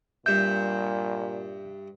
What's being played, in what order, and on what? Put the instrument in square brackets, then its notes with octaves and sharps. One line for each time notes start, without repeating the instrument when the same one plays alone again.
[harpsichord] G2 E5 [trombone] A#2 [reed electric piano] G6